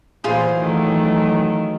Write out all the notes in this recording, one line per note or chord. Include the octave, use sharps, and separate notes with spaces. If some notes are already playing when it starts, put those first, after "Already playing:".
A#2 E3 F#3 F4 G#4 C5 B5
D#3 A3